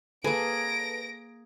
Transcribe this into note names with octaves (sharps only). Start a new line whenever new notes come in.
A#3 G#4 A4 B4 A#6 D7